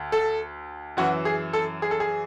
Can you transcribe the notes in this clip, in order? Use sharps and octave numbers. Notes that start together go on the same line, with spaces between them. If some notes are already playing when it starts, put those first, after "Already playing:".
Already playing: D2
A4
F#2 E3 F#4
G#4
A4
G#4
A4
G#4